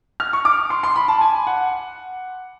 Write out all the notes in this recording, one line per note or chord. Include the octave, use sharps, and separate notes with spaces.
F6
C#6
D6
C6
C6
B5
A5
G#5
F#5